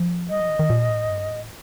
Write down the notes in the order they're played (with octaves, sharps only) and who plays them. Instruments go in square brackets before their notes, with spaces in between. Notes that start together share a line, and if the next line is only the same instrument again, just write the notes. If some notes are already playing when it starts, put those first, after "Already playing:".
Already playing: [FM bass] F3
[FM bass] G3 [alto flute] D#5
[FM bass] F3
D#3
D#3
A#2
A2
G2
A2